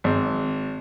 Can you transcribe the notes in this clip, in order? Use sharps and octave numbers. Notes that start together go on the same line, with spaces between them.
G#1